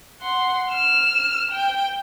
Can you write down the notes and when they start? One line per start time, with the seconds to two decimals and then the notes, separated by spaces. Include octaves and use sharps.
0.21 F#5 C6
0.72 F6 E7
1.51 G5